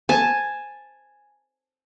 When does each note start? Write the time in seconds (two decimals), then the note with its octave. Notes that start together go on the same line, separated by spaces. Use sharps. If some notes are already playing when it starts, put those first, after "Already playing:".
0.09 G#5 A5